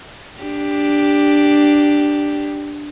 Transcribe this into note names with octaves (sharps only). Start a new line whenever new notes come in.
D4 G4